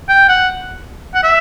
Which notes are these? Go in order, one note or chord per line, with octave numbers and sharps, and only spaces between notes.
G5
F#5
F#5
E5